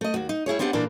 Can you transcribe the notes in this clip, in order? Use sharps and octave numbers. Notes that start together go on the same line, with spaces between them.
A3 D#5
D#2 F#4
D#4
G3 E4 G#4 C#5
B3 C4 D4 E4 G4 F#5
A#2 E3 A#3 D4 E4 A4